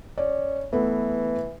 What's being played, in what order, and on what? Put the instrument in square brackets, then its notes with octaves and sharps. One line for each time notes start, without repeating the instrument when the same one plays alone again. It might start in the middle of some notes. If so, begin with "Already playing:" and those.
[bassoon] C#4 [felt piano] D5
[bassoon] E3 [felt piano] A3 B3